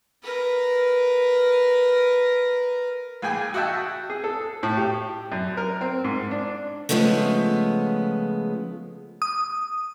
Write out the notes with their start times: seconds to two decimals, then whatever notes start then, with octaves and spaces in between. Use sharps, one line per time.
0.23 A#4 B4
3.22 A#1 G#4 G5 G#5
3.54 F#4 D#5 E5 G5 A5
4.10 G#4
4.24 A4
4.63 A2
4.77 G4
5.32 F#2
5.57 A#4
5.81 C4
6.04 G#2
6.31 D4
6.89 C#3 E3 F3 G#3 A3 B3
9.22 D#6